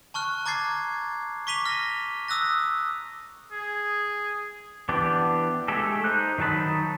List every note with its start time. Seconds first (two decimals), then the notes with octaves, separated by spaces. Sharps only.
0.14 A5 C#6 F6 F#6
0.46 A#5 D6 G#6 A6 C7
1.47 C#6 D6 B6 D#7 F7 G7
1.65 F6 A#6
2.28 D#6 E6 F#6 A#6
3.52 G#4
4.89 E3 B3 D4 G4
5.68 G#3 A3 G4 A4
6.04 D#4 C5 F#6
6.38 D#3 F#3 D#4 A5 B5